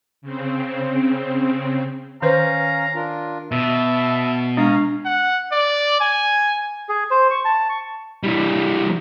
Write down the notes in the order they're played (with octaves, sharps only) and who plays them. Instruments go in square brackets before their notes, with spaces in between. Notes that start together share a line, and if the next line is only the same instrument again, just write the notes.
[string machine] C#3 C4
[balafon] D#3 B4 C5 [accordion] C#4 F5 [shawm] A#5
[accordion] D4 F4 A#4
[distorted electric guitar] B2 [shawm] E5 [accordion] A5
[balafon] G#3 D4 [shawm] C#4 [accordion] F5 A#5 D#6
[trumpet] F#5
D5
G#5
[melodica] G#4
C5
C#6
A5
C#6
[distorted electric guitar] E3 G3